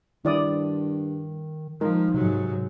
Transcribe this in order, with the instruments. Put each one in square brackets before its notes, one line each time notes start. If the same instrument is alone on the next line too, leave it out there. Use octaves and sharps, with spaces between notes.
[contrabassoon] G2 [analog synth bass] D#3 [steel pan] E4 D5 D#6
[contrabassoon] D#3 [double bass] F3 [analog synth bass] G#3 [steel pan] A#4
[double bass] G#2 F#3 [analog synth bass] C3